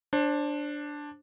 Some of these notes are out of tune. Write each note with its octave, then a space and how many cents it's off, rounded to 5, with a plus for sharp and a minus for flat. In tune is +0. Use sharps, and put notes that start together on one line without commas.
D4 +0 C5 +30